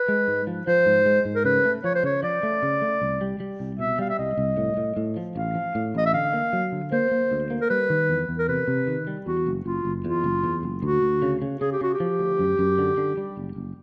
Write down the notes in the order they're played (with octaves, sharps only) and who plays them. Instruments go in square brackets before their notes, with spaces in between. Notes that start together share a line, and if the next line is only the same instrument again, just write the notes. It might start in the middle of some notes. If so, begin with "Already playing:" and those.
Already playing: [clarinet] B4
[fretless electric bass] G#3
G#2
F3
[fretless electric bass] F3 [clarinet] C5
[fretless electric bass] G#2
G#3
G#2
[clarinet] A#4
[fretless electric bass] C#3 [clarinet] B4
[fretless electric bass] A3
[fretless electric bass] F3 [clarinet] C#5
[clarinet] C5
[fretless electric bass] C#3 [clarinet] C#5
[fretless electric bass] F3 [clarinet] D5
[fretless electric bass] A3
C#3
A3
C2
G3
G3
C2
[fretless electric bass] B2 [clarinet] E5
[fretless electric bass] G3 [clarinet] F5
[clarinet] E5
[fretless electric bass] C2 [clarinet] D#5
[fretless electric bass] C2
A2
A2
A2
F3
[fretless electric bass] A1 [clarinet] F5
[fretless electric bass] F3
A2
[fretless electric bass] A1 [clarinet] D#5
[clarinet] E5
[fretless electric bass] D3 [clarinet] F5
[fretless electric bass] A#3
F#3
D3
[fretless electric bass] A#3 [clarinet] C5
[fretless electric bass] A#3
D2
A#3
[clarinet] A#4
[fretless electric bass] G3 [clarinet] B4
[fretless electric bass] D#3
E2
E2
[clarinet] A#4
[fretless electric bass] C3 [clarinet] B4
[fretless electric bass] C3
D#3
G3
[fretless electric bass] E2 [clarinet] F#4
[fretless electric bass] F#1
[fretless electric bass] F#1 [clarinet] F4
[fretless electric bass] F#1
[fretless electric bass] E2 [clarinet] F4
[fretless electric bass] F#1
E2
F#1
[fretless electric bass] D2 [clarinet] F#4
[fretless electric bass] D2
C#3
C#3
[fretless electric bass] C#3 [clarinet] G#4
[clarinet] G4
[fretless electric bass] C#3 [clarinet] F#4
[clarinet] G4
[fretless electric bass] F3
D2
F#2
F#2
D3
D3
G3
F#1
F#1